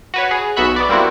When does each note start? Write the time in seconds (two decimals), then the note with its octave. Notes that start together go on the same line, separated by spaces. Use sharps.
0.14 F#4 B4 C#5
0.31 G#4
0.56 B1 B3 F#4 E5 B5 F#6
0.76 B3 D5
0.89 G3 A#3 C4 E4 F#4